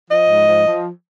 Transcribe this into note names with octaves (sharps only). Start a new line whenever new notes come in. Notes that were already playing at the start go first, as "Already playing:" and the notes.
F3 D#5
G#2
F3
F3